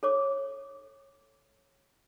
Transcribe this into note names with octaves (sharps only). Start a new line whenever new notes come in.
A4 C#5 D6